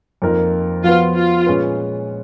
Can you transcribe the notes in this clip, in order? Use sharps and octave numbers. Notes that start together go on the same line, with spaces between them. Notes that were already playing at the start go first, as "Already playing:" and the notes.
F2 F3 A#3 D#4 A#4
F3 B3 F4 F#4 B4
F4
A#2 G#3 C#4 G#4 B4